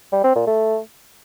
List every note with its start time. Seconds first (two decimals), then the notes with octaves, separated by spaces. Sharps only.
0.12 G3
0.24 C4
0.36 A#2
0.47 A3